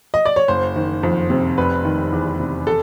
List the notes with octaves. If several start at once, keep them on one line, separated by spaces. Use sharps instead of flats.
D#5
D5
C#5
F#1 C5
D#3
F2
C3
F1 B4
D#3
E2
C3
A4